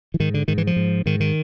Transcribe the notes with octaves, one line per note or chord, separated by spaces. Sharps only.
E3
G#2 D#3
D3
G#2 D#3
E3
F3
G#2
G#2 D#3
D#3